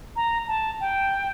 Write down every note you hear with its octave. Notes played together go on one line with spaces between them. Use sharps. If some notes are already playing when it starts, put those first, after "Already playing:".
A#5
A5
G5